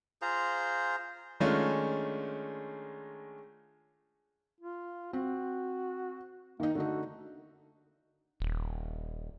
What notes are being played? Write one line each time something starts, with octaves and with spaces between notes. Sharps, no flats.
F4 G#4 C5 A#5
D#3 G#3 A3 C#4 D4 F4
F4
C4 F#4
D#3 A#3 D#4
D3 A3 D#4 F#4
D#1